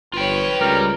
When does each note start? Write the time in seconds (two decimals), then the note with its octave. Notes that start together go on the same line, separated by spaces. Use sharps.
0.14 G1 F4 B4 C#5 G5
0.61 C#2 G3 A#4